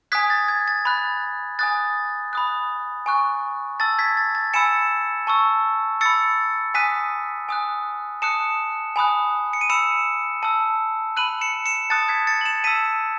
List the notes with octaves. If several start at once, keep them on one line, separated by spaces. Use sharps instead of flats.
G#5 D#6 F#6 G#6 B6
A6
G#6
A6
B5 F#6
G#5 D#6 F#6 A6
B5 D#6 F#6
G#5 C#6 F#6
A5 E6 A6
G#6 B6
A6
A6
G#5 B5 E6 C#7 E7
A5 C#6 E6
B5 E6 A6 C#7
G#5 D#6 F#6 B6 D#7
G#5 D#6 F#6
A5 D#6 F#6 C#7 E7
G#5 B5 D#6 F#6
C#7
D#7
B5 E6 C#7 E7
A5 E6
B5 F#6 D#7 F#7
C#7 E7
C#7 E7
A5 D#6 F#6 A6 C#7
G#6 B6
A6 C#7
F#7
C#7 E7
A5 E6 B6 D#7